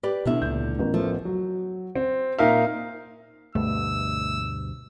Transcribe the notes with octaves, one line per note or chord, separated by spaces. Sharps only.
G4 B4 D5
E2 B2 D3 B3 D4 E5
C#2 A#2 G6
A1 B3 A#4
F3 A3
F#3
C4
A#2 D#4 A#4 E5 F5
D2 G2 B2 A3 E6